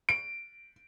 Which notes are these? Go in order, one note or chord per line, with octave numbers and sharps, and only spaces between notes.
D7